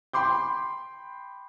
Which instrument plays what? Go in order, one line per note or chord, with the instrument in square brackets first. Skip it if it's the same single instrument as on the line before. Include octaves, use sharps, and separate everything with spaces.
[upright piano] G5 B5 C6 D6 G6